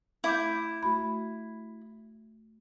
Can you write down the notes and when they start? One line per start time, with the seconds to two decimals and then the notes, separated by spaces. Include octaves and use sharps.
0.24 A3 E4 D6 G6
0.83 A3 F#4 B5